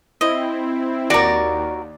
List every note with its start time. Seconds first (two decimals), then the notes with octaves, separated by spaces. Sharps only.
0.21 C4 E4 D#5
1.10 D#2 F#4 A#4 D5